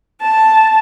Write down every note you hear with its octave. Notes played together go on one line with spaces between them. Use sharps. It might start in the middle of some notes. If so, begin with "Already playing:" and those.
A5